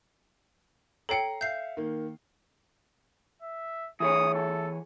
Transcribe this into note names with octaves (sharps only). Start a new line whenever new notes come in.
A4 C#5 G5 A#5 C7 C#7
E5 F5 G6 C7
D#3 A#3
E5
E3 G#4 C#5 D#6
A4